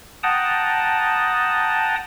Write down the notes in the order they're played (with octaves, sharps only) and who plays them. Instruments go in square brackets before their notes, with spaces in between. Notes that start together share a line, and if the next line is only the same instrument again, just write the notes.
[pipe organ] F#5 G5 A5 A#5 D#6